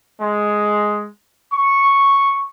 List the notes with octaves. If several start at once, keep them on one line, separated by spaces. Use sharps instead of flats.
G#3
C#6